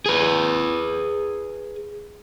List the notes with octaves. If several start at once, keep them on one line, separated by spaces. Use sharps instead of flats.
G#4 B4